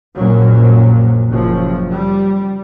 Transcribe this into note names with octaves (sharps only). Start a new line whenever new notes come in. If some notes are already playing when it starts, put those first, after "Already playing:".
A#1 F#2 A#2 F#3
F#1 F#2 F3
G3